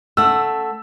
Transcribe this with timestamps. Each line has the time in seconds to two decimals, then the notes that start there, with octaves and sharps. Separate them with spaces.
0.17 A3 F#5 E6